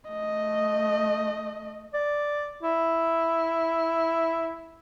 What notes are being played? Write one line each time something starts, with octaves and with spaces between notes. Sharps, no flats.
A3 D#5
D5
E4